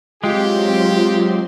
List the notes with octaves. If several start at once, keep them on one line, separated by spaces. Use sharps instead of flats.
F#3 G#3 C4 F4 G4 C6